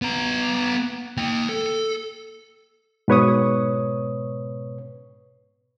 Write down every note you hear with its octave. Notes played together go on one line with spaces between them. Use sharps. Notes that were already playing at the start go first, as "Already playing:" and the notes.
B3 A#5
A#3 G5
A4
G#2 B2 B4 C#5 C#6 D#6